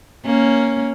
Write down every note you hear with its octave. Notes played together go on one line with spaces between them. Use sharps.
A#3 C#4